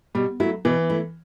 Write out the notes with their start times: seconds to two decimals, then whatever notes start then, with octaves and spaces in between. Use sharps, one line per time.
0.15 B2 G3
0.40 F#3 E4
0.43 A3
0.65 B2 E3
0.90 A3 E4